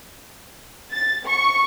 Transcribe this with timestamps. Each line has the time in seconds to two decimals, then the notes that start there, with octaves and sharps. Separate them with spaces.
0.92 A6
1.26 C#6